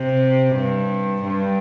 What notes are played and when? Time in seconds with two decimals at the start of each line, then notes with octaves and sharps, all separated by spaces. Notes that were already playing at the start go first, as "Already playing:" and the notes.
Already playing: C3
0.54 G2
1.25 G2